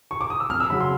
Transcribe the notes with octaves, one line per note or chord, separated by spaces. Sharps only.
C#6
D6
D#6
E6
F2 F6
E6
C#3 F#3 B5
C6